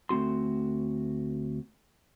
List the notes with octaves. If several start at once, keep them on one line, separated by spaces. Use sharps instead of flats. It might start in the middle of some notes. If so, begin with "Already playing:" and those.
D2 A3 C4 F#4 C6